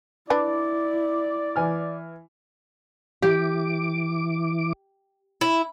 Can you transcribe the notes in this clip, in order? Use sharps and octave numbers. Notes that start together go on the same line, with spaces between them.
D4 E4 B4 D5
E3 G#5 F6
E3 G4 D6
E4